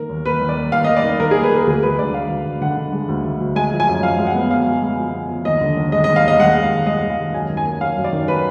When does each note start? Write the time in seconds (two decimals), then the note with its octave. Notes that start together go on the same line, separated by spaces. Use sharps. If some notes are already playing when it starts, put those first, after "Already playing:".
Already playing: D#3 A#3 A#4
0.09 D#2
0.25 A#3 B4
0.41 D#2
0.49 D5
0.57 A#3
0.72 D#2 F5
0.84 D#5
0.89 A#3
0.96 D5
1.04 D#3
1.20 D#3 A#4
1.31 G#4
1.36 A#3
1.43 B4
1.51 A#3 A#4
1.67 D2 G#4
1.83 G#3 B4
1.98 D3 D5
2.14 D2 F5
2.30 D2
2.45 D2
2.61 D3 F#5
2.77 D3
2.93 G#3
3.09 D2
3.25 D2
3.40 D2
3.55 G#3 G#5
3.72 F3
3.80 G#5
3.88 F#2
4.03 F3 F5
4.19 G#3
4.27 F#5
4.35 B3
4.51 F3 F5
4.66 G#3
4.82 G#3
4.97 F3
5.13 B3
5.29 F3
5.45 D#2 D#5
5.61 D3
5.77 D#2
5.92 G#3 D#5
6.04 D#5
6.08 D#2
6.16 F5
6.24 D#2 D#5
6.39 G#3 F#5
6.55 G#3
6.63 F5
6.71 D#2
6.86 G#3 D#5
7.02 G#3
7.10 F5
7.18 D#2
7.34 F#2 G#5
7.50 D#3
7.57 G#5
7.65 A#3
7.81 F#3 F5
7.97 F#2
8.04 D5
8.13 D#3
8.28 F#3 B4